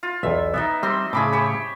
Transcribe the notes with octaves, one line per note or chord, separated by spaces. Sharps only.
F4
B1 E2 E5
B3 D#4 D5 E5
G3 C4 C5 C6
A2 C#3 G#4 B5 D6
G4 C5 C#5